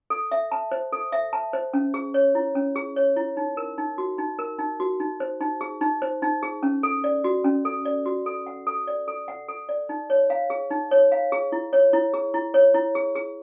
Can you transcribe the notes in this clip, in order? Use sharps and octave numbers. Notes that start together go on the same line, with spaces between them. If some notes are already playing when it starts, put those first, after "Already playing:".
A4
E5
A5
C5
A4
E5
A5
C5
C#4
G#4
C#5
E4
C#4
G#4
C#5
E4
D#4
A#4
D#4
F#4
D#4
A#4
D#4
F#4
D#4
C5
D#4
G#4
D#4
C5
D#4
G#4
C#4
A4
D5
F#4
C#4
A4
D5
F#4
A4
F#5
A4
D5
A4
F#5
A4
D5
D#4
C#5
F5
G#4
D#4
C#5
F5
G#4
E4
C#5
E4
G#4
E4
C#5
E4
G#4
G#4